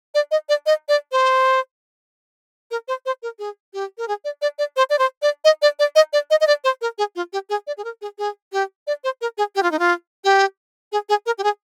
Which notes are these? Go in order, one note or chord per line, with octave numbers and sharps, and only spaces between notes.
D5
D#5
D5
D#5
D5
C5
A#4
C5
C5
A#4
G#4
G4
A#4
G#4
D5
D5
D5
C5
D5
C5
D5
D#5
D5
D5
D#5
D5
D#5
D#5
D5
C5
A#4
G#4
F4
G4
G#4
D5
G#4
A#4
G#4
G#4
G4
D5
C5
A#4
G#4
G4
F4
D#4
F4
G4
G#4
G#4
A#4
G4
G#4